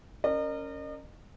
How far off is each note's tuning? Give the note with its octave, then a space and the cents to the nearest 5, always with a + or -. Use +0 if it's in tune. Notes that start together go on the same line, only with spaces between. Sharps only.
C#4 +0 A#4 -15 D#5 -40